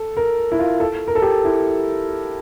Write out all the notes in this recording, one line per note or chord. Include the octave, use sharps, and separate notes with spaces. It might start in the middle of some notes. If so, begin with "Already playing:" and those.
Already playing: A4
A#4
E4
F4
A4
A#4
A4
G4
E4